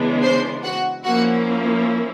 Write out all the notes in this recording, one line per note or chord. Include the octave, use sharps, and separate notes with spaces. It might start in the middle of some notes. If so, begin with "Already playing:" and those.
Already playing: C#3 E3 G#3 B3 D4
C5 C6
F#4 F#5
F3 A#3 C#4 E4 F#4 F#5